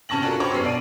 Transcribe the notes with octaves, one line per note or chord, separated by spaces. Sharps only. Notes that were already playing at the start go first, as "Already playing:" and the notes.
C3 C#4 A5 C#6 A#6 F#7
C#4 D4 F4 F#4 A4 A#4
G4 C5 C#5 B5 C#6 D6
F#2 B3 C#4 C7
B2 D5 D7 D#7